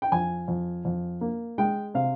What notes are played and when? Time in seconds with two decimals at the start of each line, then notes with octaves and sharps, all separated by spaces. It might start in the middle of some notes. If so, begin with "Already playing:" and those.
0.02 G5
0.12 F2 G#5
0.48 F2
0.85 F2
1.21 A#3
1.58 G#3 G5
1.94 C3 F5